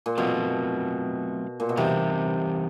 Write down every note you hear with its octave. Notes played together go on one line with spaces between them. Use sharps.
A#2
B2 F#3 A3 C4 F4 A4
A#2
B2
C3 E3 G3 C4 D#4 G4